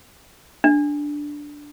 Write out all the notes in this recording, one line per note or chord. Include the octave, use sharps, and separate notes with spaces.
D4